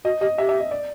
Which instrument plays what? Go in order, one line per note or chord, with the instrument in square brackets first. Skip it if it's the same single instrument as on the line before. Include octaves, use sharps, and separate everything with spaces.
[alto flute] F#4 [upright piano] D#5
[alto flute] G4 [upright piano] D#5
[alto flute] G4 [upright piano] E5
[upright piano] E5
D#5
D5